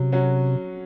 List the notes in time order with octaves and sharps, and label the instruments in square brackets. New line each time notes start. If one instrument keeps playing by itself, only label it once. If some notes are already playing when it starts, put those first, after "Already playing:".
Already playing: [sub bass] C3 [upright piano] F#3 C#4
[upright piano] F#3 C#4 F#4